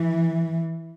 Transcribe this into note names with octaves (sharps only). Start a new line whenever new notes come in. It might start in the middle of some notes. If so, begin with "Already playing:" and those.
Already playing: E3